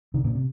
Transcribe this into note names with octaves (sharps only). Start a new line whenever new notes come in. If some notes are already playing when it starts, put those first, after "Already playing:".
C3 D#3
A#2 C#3
C3